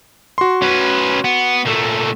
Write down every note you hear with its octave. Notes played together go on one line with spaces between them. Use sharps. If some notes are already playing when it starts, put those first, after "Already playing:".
F#4 C6
C#4 B4
B3
A#2 A3